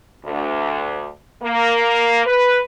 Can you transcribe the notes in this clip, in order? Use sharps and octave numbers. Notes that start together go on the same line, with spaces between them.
D2
A#3
B4